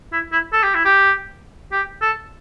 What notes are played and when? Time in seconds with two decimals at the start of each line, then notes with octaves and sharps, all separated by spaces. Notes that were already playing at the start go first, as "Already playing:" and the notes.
0.13 E4
0.32 E4
0.53 A4
0.63 G4
0.75 E4
0.85 G4
1.72 G4
2.02 A4